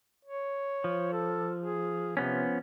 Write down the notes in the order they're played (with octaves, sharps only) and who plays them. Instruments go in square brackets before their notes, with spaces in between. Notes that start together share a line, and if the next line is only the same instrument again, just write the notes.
[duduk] C#5
[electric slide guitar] F3
[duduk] A4
G#4
[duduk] C3 [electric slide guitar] F3 B3 C#4